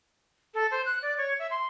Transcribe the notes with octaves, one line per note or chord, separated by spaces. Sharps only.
A4
C5
F#6
D5
C#5
E5
C6